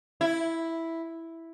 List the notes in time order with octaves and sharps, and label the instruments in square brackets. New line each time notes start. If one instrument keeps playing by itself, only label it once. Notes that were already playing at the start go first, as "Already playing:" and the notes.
[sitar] E4